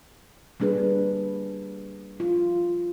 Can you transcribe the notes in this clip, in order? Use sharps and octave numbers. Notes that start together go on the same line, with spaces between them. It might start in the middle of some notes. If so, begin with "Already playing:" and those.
G3 A#3 D4 G#4 B4
F4